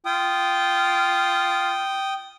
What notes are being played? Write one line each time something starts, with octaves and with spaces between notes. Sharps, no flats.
F4 G5 D#6